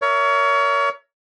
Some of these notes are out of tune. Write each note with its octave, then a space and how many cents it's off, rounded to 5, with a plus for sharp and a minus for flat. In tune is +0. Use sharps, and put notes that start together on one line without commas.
A#4 +0 C#5 +30 E5 +0